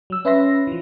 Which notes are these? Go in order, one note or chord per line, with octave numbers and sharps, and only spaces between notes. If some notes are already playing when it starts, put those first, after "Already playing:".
F#3 E6
C#4 B4 E5 B5 C6 A#6
E3 F3